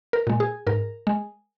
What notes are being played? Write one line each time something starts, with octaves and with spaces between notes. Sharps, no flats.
A#4
A#2 G#3
G#4
G#2 A#4
G#3